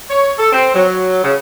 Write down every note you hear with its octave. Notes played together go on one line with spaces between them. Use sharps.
C#5
A4
C4
F#3
C#3